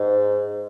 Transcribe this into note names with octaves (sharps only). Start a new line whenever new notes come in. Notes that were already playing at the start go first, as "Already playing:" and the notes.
Already playing: G#2